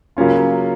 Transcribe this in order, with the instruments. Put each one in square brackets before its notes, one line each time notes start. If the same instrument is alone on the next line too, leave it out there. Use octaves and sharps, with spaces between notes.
[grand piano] C#3 F#3 A#3 C#4 F4